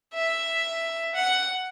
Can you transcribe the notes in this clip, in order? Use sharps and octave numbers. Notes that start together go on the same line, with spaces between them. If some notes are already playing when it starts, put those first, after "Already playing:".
E5
F#5